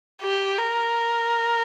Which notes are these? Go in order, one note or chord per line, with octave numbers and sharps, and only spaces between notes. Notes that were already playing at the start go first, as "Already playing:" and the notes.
G4
A#4